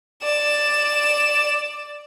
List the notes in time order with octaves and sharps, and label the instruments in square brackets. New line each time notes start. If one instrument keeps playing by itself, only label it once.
[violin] D5 E7